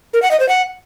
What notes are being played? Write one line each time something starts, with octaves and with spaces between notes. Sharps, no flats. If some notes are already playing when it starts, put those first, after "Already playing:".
A#4
F#5
D#5
C5
F#5